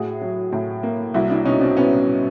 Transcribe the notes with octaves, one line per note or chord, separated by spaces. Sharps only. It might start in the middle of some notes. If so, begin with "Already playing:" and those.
Already playing: A2 F#4 G#4
F#3
A2
A#3
C2 E4 F#4
D4 E4
B2 C#4 D#4
C4 D4
B3 C#4